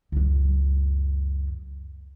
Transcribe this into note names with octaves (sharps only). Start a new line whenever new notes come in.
C#2 F#2